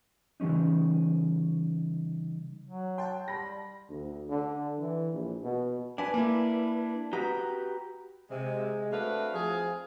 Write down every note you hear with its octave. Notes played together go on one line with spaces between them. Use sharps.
C#3 E3 G3 C#4 D#4
F#3
F#5 G5 A5 C6
G3 B5 A#6
D2
D3
E3
A#1
B2
D4 B4 G#5
A#3 E4
F#4 G4 B4 A#5
C3 G#3
A3 C4 D4 F#4 B4 F5
F3 G#4